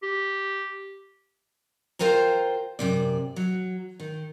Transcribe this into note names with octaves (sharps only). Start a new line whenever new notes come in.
G4
F4 A#4 C5 G5 A#5
F#2 C3 D5
F#3
D#3